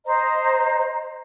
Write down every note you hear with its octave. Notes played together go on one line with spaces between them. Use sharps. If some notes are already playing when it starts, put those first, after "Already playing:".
C5 D#5 A#5